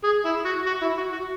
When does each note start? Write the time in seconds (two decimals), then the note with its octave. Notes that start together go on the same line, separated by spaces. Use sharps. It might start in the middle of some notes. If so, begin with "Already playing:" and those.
0.04 G#4
0.25 E4
0.45 F#4
0.66 F#4
0.82 E4
0.97 F#4
1.13 F#4